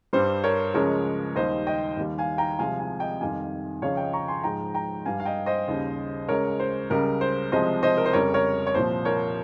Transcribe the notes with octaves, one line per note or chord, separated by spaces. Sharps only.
G2 G3 C5
A#4 C#5
C#2 C#3 F3 G#3 A#4 C#5
D#2 D#3 G3 C5 D#5
D#5 G5
D#2 D#3 G3
F5 G#5
G5 A#5
C2 C3 F3 G#3 F5 G#5
F5 G#5
D#5 G5
F2 D#3 G3 F5 G#5
C#2 C#3 F3 G#3 C#5 F5
D#5 G5
A#5 C#6
G#5 C6
G#2 F3 G#3 G5 A#5
G5 A#5
G2 G3 F5 G#5
F5
D#5 G5
C5 D#5
D#2 C#3 G3
C#2 C#3 G#3 A#4 C#5
C5
C#2 C#3 G3 A#4
C5
C2 C3 F3 G#3 C5 D#5
C5 D#5
A#4
C5
F2 C#3 G3 A#4 C#5
A#4 C#5
C#5
C2 A#2 F3 C5
A#4 C#5